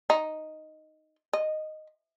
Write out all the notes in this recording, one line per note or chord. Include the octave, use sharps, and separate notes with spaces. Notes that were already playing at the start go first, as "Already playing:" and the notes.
D#4
D#5